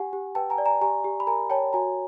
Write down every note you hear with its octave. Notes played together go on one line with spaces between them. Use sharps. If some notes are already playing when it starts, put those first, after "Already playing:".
Already playing: G4 F#5 G#5
G4
B4 G5 A5
G#5 A#5
D5
G#5 A#5
G4 G#5 A#5
G4
B5
A#4 G#5 A#5
C#5 G5 A5
F#4 G#5 A#5